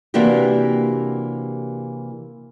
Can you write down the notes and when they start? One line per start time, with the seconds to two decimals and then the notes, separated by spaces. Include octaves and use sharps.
0.14 C3 E3 A#3 D4 F#4 G4